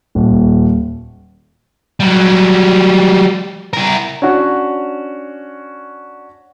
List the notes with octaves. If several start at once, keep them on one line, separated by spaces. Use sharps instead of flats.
D#1
F#3 G3
E4 A#4
C#4 D4 F#4